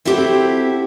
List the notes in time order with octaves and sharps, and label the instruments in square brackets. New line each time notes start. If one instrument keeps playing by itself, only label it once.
[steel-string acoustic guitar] C4 E4 F#4 G4 A4 C5